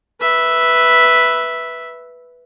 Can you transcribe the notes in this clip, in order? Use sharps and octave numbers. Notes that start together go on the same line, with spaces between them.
B4 E5